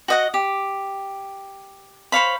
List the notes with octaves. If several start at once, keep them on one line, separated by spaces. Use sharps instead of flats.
F#4 D#5 F#5
G4
C5 C#5 F5 B5